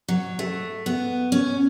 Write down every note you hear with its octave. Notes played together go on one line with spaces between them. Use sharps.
F#3
A3
B3
C#4